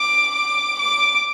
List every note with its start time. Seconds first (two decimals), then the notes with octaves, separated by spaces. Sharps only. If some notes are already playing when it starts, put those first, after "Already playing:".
Already playing: D6
0.35 D6
0.79 D6